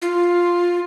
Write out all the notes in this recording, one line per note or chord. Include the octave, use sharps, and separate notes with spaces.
F4